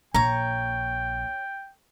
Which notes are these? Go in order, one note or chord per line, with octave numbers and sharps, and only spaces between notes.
A#1 C#5 G5 A#5